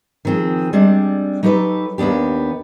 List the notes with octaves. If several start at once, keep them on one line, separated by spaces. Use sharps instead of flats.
D#3 F3 C4 G#4
G3 G#3 C4 D4
F#3 D#4 G4 A4 B4
D#2 A#3 B3 D4 G4